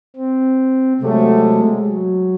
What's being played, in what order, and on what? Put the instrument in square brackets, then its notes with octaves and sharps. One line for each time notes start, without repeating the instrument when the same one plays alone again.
[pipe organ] C4
[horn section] C3 F#3 A3 [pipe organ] G#3
[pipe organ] F#3